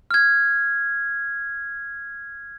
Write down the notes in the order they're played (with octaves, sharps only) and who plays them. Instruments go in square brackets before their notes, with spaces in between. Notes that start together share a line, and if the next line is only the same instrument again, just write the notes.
[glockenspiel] F6 G#6